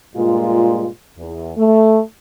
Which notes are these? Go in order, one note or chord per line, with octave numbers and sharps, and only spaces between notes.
G2 A#2 G#3 F4
E2
A3